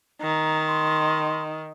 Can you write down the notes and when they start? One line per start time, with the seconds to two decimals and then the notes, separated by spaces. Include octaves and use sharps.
0.21 D#3 A#5
0.67 C6